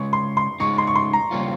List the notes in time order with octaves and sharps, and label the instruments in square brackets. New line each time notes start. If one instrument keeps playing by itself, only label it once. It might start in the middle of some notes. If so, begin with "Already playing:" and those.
Already playing: [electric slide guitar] C#3 G#3 C#4 [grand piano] C#6
[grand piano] C6
C6
[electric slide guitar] C#3 G#3 D#4 [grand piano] C#6
[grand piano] C6
C#6
C6
A#5
[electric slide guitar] C#3 G3 A#3 C#4 F4